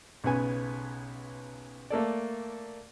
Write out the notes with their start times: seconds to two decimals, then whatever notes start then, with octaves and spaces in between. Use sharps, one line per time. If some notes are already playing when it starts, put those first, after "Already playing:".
0.24 B1 C#3 B3 G#5
1.90 A3 A#3 A4 D5